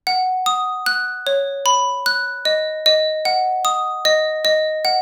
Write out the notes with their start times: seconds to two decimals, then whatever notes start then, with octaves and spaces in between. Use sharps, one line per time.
0.07 F#5
0.46 D#6
0.86 F#6
1.27 C#5
1.66 B5
2.06 F#6
2.45 D#5
2.86 D#5
3.25 F#5
3.65 D#6
4.05 D#5
4.45 D#5
4.85 F#5